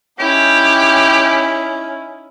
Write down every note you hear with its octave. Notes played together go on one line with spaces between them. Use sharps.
C#4 D#4 E4 G4